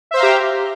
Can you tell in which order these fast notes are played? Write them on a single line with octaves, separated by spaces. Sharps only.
E5 C5 F5 A#5 G4